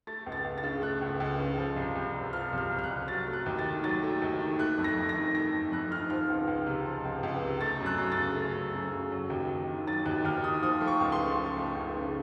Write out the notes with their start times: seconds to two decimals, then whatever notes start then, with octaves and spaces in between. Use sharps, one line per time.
0.07 A3 A6
0.26 C#2
0.32 A6
0.44 C#2
0.58 A6
0.64 C#3
0.82 A3 F#6
1.01 C#2
1.20 C#2
1.39 C#3
1.58 F3
1.76 C2
1.95 C2
2.14 C3
2.33 F3 F6
2.52 C2
2.58 F6
2.71 C2
2.79 F6
2.84 F#6
2.89 C3
3.08 F#3 A6
3.27 A3
3.33 F#6
3.46 D#2
3.59 A6
3.65 D#3
3.84 F#3 A6
4.03 A3
4.22 D#2
4.40 D#3
4.59 A3 F#6
4.78 F2
4.84 A#6
4.98 F2
5.09 A#6
5.15 D#3
5.35 A3 A#6
5.54 F2
5.72 F2 F#6
5.91 D#3 F6
6.10 F3 F6
6.30 C#2
6.47 C#2
6.66 C3
6.86 F3
7.05 C#2
7.23 C#2
7.42 C3
7.61 A3 A6
7.80 F#2
7.86 F#6
7.98 F#2
8.12 A6
8.18 C#3
8.36 A3
8.55 F#2
8.74 F#2
8.93 C#3
9.11 F#3
9.30 D#2
9.49 D#2
9.68 D#3
9.87 F#3 A6
10.06 D#2 F#6
10.25 D#2 F6
10.44 D#3 D#6
10.63 F3 D#6
10.81 A3
10.87 C#6
11.00 C#2
11.12 C6
11.18 C#3
11.37 F3
11.57 A3
11.75 C#2
11.94 C#3